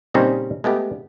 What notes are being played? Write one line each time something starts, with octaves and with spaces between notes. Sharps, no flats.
A#2 C#3 G3 C4 C#4 D#4
G#3 A3 B3 G4